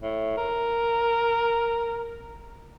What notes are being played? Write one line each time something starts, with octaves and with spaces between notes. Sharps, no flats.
A2
A#4